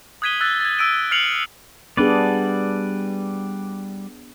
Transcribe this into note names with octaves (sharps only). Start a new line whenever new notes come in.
D#6 F#6 G#6 B6 D#7 G7
E6 F#6 A6
G#6 A6
E6 D7 D#7
F6 F#6 C7 C#7 F7 F#7
G3 B3 D4 G#4 B4 D5